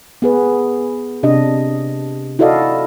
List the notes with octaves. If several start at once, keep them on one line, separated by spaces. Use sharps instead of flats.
B3 G#4 B4
C3 D4 D#5
E4 F#4 A4 D5 D#5 F5